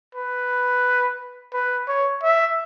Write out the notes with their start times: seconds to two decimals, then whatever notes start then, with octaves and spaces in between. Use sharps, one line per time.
0.15 B4
1.53 B4
1.88 C#5
2.23 E5